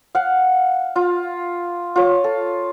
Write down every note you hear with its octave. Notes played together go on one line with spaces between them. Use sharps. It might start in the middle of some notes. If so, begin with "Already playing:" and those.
F5 F#5
F4
F4 C#5
A4